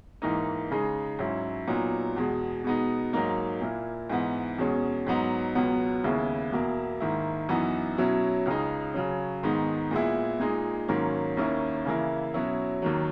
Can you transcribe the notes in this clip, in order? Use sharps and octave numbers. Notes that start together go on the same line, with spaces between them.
G#2 E3 A#3 D#4
C#3 G#3 D#4
G#2 F#3 C#4 E4
A#2 F#3 B3 D#4
E2 B2 G#3
B2 G#3 B3 D#4
G#2 F#3 A#3 D#4
A#2 A#3 E4
G#2 E3 B3 D#4
E2 B2 G#3 C#4
G#2 F#3 B3 D#4
C#2 B2 F#3 B3
D#2 C#3 G#3 B3 E4
E2 B2 A#3 E4
G#2 D#3 A#3 E4
F#2 E3 B3 D#4
B2 F#3 C#4 E4
C#2 C#3 G#3 D#4
C#3 F#3 C#4
G#2 D#3 G#3 B3 D#4
A#2 G#3 B3 E4
A#2 G#3 D#4
G#2 D#3 F#3 A#3 C#4
D#2 D#3 A#3 C#4 E4
C#3 E3 A#3 E4
B2 F#3 C#4 E4
D#2 D#3 F#3